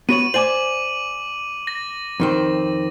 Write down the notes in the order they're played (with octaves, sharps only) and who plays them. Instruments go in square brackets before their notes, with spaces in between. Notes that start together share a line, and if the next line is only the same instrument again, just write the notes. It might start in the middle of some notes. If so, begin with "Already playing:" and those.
[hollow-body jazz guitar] B3 F#4 C#5 [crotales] D#7 F#7
[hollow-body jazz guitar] C5 D5 G#5 [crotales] D6 D#7 F#7
[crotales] A#6
[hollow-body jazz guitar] F2 D#3 C4